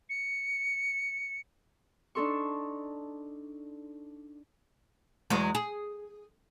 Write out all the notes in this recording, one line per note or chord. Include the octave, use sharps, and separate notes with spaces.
C#7
D4 D#4 A4 C6 C#6
E2 F#3 G#3
G#4